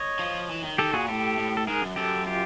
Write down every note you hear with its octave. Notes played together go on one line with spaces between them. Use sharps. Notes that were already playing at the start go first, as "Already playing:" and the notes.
Already playing: C#5 D#5
F3
E3
D#3
D#3 G4 A4
A#2 F#4 G#4
A2 G4 A4
A2
A4
G#2 G#4 A#4
F#2
F#2 G4 A4
F4 G4